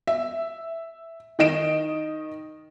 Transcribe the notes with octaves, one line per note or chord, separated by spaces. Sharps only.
E5
D#3 D#5 D7 E7